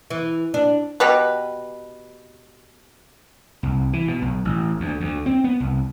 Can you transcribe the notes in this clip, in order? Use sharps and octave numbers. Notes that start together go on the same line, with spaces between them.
E3
D4
B2 G4 B4
C2
E3
B2
B1
A1
D2
D2
C4
B3
C2